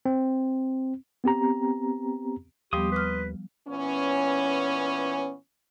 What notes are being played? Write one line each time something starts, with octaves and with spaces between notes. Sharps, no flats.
C4
B3 C4 G4 A#5
D#2 F3 G3 B3 G4 C6 D#6
B4 D6 F6
A#2 E3 B3 C#4